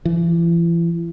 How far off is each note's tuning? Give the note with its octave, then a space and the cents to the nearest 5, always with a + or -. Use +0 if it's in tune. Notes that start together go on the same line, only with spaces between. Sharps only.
E3 +40